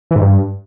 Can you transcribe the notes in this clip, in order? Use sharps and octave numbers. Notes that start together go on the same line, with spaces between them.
E3
G#2
G2